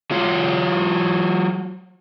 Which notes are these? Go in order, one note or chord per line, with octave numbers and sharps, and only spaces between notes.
F#3 F4 C#5